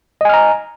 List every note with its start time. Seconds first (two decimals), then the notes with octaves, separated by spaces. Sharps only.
0.21 D#5
0.25 G#5
0.29 F6
0.34 A#5